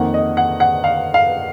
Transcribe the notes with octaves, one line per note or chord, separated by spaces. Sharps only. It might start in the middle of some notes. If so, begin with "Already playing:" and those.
Already playing: F2 D#3 A#3 F#5
D#5
F#5
F#5
F5
F5